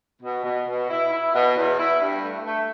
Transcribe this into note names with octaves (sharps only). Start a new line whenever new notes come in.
B2
B2
B2
E4
E4
B2
E2
E4
G2
A3
A3